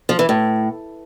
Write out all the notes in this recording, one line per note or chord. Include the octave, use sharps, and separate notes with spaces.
F3
E3
A2